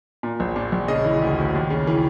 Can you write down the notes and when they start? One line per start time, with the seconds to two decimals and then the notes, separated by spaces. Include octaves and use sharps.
0.23 A#2
0.40 A#1
0.56 A#2
0.72 A#1
0.88 C#3 D#5
1.05 E3
1.22 D2
1.38 D2
1.54 D#2
1.70 C#3
1.87 E3